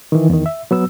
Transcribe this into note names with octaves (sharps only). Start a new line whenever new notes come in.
D#3 E3
E2 D#3
E5
F#3 B3 E6